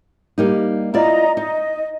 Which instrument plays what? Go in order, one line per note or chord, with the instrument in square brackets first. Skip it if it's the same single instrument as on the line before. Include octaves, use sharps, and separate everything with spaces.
[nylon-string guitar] G3 A#3 D#4
[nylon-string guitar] E4 F4 D5 [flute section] D#5 A#5
[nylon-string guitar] D#4 [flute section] D#5